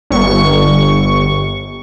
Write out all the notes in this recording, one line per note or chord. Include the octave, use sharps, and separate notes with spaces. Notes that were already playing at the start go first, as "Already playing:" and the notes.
G1 C#6